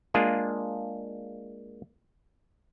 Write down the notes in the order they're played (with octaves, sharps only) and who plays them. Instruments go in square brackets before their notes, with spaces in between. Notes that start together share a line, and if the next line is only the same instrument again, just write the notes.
[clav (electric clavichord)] G#3 A#3 D4 F4 G#4